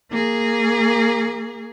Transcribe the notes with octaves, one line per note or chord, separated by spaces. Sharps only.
A#3 G#4